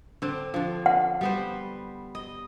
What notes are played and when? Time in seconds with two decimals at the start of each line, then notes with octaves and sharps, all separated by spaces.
0.22 D3 C4
0.54 D3 F3
0.86 F#5
1.21 G3 B3 C5
2.15 D#5